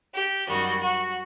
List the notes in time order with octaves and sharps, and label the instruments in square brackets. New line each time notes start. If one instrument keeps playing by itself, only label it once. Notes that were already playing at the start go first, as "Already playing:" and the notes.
[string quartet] G4
F#2 D#3 G3 F#4
F#4